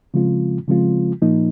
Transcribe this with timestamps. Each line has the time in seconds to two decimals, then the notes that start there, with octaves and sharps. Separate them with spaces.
0.14 C#3 F3 G#3 C4 F4
0.68 C#3 F3 G#3 C4 F4
1.22 A#2 F3 A#3 D#4